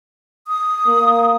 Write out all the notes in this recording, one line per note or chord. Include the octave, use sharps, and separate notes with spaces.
D#6
A#3